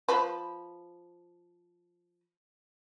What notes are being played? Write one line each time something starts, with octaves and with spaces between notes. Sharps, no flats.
F3 B4